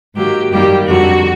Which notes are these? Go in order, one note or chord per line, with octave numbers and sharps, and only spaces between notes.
G#2 D#3 F#3 A#3 G4
F#2 D#3 G3 A#3 G4
F2 D3 F#3 F#4